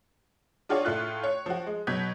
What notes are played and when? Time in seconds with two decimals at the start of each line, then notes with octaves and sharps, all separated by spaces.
0.69 D4 F4 F#4 G#4 C#5 D5
0.85 A2 A3 F4 F#6
1.23 C#5
1.46 F3 F#4
1.66 G#3
1.87 B2 F#3 G6 G#6 B6